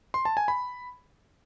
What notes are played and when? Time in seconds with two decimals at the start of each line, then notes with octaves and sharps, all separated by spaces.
0.14 C6
0.25 A5
0.37 G#5
0.48 B5